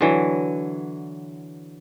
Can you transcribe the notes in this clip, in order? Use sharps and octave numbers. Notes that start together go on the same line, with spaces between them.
D3 E3 F#3